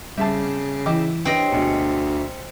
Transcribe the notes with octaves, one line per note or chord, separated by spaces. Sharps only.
C#3 G3 C4 E5 A5
E3 E4 D#5 G5 D6
C4 D4 G4 B4 C#5 D#5 G5
D2 B2 G#3 B6 C#7